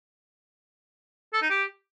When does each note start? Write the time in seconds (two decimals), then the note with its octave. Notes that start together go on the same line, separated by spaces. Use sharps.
1.33 A4
1.42 D#4
1.50 G4